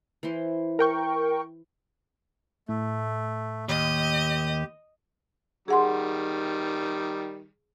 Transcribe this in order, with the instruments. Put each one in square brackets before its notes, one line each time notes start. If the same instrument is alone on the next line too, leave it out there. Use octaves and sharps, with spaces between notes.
[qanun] E3 E4 C5
[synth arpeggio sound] A#4 G5 C#6
[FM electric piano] A2 [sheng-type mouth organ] A3
[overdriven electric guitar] D#2 [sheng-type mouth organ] G4 [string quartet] D#5
[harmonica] D#3 G3 [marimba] G#4 F#5 C6